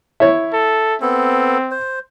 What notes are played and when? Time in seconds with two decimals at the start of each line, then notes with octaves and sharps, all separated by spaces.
0.20 E4 C#5
0.53 A4
1.02 B3 C4 A4
1.71 C5